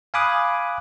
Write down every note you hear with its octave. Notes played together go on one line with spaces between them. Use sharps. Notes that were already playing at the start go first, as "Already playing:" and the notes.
F5 G#5 B5 D6 D#6 F#6